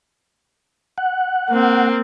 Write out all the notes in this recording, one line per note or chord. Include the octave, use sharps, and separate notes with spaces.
F#5
A#3 C4